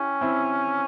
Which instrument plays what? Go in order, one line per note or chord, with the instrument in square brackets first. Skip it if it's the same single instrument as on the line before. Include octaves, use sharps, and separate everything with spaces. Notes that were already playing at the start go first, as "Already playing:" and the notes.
Already playing: [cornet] C#4 [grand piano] E4 G4
[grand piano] C4 E4